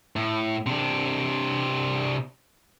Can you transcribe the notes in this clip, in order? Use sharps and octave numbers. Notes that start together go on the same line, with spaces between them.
A2
C3 D4